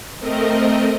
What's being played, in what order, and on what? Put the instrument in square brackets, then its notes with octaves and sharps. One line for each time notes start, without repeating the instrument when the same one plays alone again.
[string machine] A3 C4 A#4 D#5